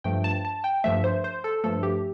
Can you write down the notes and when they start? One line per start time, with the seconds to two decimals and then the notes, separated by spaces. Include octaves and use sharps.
0.04 G2 F3 A3 G5
0.24 A5
0.45 A5
0.64 G5
0.84 G2 F3 A3 E5
1.04 C5
1.24 C5
1.44 A4
1.64 G2 F3 A3 A4
1.83 G4